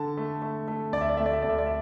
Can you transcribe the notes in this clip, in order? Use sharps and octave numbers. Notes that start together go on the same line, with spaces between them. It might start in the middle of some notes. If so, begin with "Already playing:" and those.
Already playing: D3 A5
A3
A3
A3
D2 D5
E5
D5
A3 E5
D5
E5
D2 D5
E5
D5
E5